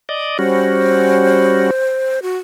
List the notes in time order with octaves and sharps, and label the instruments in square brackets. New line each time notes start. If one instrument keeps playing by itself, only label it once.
[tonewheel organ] D5 D#5
[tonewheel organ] G3 C#4 F#4 [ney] C5
[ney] F#4